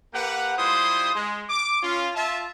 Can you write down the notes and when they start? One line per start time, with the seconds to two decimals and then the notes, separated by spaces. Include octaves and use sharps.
0.14 A#3 G4 B4 F#5
0.58 G3 E4 F4 C5 C6 D#6
1.15 G#3
1.49 D6
1.83 C#4 F4
2.15 F4 E5 A5